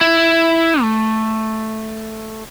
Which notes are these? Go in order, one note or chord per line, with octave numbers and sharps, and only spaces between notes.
E4
A3